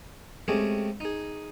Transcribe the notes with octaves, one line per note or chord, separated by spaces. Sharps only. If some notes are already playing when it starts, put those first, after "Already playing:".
G#3 A3 C4 C#4 G4 G#4
D#4 G#4